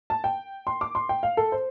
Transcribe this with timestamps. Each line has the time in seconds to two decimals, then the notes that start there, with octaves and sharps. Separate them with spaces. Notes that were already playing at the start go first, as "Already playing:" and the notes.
0.10 A5
0.24 G5
0.67 C6
0.81 D6
0.95 C6
1.09 G5
1.23 F5
1.37 A4
1.52 C5